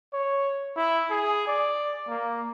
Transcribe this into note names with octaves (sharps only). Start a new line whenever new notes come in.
C#5
E4
G#4
D5
A#3